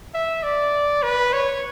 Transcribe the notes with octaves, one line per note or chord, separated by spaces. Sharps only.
E5
D5
B4
C#5